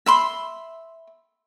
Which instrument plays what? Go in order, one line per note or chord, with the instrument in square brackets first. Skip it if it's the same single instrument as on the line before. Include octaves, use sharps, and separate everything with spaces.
[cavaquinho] E5 B5 C6